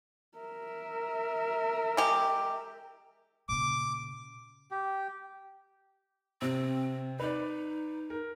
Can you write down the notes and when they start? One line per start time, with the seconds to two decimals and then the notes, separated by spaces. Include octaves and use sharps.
0.38 A#4 E5
1.97 G#3 G4
3.49 A#2 C#3 D6
4.71 G4
6.42 C3 C4
7.20 D#4 B4 D5
8.10 A#4